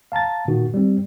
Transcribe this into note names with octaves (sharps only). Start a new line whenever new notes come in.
F5 A5 A#5 A6
A#2 D#3 F#4
G3 C4